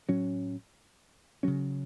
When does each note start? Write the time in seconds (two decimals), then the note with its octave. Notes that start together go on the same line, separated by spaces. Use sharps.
0.08 A2 F#3 C#4
1.43 C#3 F#3 C#4